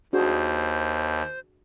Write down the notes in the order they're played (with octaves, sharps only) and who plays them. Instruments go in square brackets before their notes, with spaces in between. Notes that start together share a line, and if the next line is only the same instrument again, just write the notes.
[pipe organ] D#2 [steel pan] D4 F#4 G#4 [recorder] C5